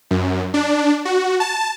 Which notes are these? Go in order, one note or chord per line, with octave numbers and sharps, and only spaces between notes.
F#2
D4
F#4
A5